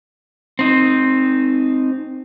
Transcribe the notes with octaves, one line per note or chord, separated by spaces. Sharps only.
C4 D#4